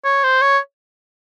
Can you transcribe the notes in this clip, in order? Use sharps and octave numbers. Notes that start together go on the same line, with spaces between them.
C#5
C5
C#5